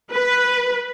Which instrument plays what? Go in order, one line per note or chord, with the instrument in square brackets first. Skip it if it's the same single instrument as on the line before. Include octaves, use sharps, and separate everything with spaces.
[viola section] B4